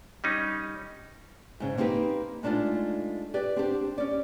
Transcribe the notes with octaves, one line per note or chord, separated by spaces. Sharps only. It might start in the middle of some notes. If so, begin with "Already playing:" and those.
G3 C#4 D#4
G#2 C#3
A#3 C4 D#4 G4 B4
G#3 A3 D4 D#4 F4
G4 B4 D5
C4 D4 G4
C#4 D5